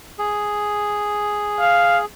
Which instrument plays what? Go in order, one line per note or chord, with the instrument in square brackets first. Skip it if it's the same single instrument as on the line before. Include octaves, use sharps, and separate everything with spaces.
[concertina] G#4
[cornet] F5